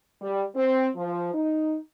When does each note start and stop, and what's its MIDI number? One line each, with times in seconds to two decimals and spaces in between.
0.21 0.44 55
0.55 0.87 60
0.96 1.31 53
1.34 1.76 63